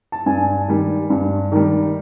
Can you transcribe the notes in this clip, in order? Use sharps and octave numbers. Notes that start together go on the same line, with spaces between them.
A5
G2 G#5
D#3 G3
G2
D#3 G3